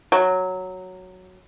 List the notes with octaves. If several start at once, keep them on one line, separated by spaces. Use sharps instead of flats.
F#3